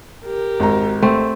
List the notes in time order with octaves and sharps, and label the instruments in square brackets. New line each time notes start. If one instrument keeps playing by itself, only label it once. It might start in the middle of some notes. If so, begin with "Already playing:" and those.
[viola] G4 A#4
[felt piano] G#1 A#5
[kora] A3 C4